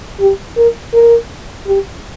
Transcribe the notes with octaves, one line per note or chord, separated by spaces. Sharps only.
G4
A#4
A#4
G4